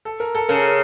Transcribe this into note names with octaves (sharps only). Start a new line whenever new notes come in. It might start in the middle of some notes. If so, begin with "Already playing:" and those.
A4
A#4
A4
C#3 A#4